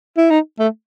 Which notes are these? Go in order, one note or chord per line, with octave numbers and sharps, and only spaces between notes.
E4
D#4
A3